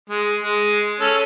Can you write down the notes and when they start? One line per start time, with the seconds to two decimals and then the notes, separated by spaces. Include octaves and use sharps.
0.10 G#3
0.43 G#3
1.01 C#4 A4